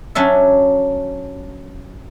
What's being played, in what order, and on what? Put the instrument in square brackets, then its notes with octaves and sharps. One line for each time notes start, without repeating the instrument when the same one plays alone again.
[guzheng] F#3 C#4 D4 E5